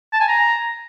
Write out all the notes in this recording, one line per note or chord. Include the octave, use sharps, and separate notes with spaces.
A5
G#5
A#5